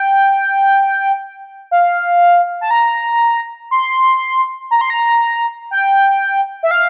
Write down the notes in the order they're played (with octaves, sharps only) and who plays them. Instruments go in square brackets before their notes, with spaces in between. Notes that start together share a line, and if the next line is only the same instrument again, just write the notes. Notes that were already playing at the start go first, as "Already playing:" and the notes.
Already playing: [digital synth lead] G5
F5
A5
A#5
C6
A#5
C6
A#5
G5
E5
F5